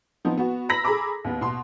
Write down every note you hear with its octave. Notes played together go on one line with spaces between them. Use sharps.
F3 B3 C4 D#4
B3 F#4
A#5 B5 E6 A#6 B6 F#7
G#4 A4 A#5 B5 D6 E6
D#2 B3
B2 C6